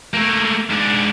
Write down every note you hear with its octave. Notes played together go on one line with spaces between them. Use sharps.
A3 A#3
G#2 D4